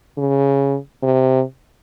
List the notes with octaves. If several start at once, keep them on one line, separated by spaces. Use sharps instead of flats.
C#3
C3